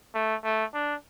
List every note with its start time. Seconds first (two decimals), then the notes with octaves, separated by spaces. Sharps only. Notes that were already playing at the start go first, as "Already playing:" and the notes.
0.15 A3
0.44 A3
0.74 D4